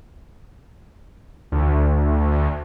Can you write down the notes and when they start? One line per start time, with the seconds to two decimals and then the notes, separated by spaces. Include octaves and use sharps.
1.52 D2